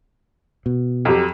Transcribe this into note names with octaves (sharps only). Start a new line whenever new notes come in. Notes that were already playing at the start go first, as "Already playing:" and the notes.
B2
F2 F#3 G4